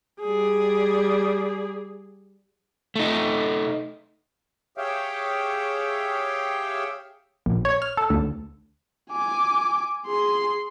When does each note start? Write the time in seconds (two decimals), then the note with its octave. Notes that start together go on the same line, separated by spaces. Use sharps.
0.21 G3 G#4
2.96 A3 D#4
4.78 G4 G#4 C#5 E5 F5 G5
7.46 A#1
7.65 C#5
7.82 F6
7.97 A4
8.10 D2
9.12 G#5 D6
10.07 G#4 C6